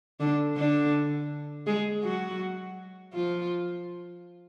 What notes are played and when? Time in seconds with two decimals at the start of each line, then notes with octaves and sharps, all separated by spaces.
0.20 D3 D4
0.57 D3 D4
1.67 G#3 G#4
2.03 F#3 F#4
3.13 F3 F4